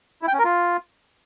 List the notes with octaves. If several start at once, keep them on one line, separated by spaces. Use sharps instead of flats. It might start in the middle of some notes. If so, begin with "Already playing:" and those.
E4
G5
C#4
A#4
F4